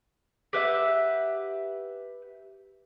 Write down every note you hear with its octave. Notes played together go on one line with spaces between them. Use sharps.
G4 B4 E5 F#5